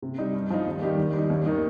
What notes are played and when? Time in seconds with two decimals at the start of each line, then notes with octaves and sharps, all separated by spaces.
0.02 C3
0.18 G3 D#4
0.34 G2
0.50 F3 D#4
0.66 D#2
0.82 D#3 G3 D#4 G4
0.98 D#3
1.14 G3 D#4
1.30 D#2
1.45 D#3 A#3 D#4 G4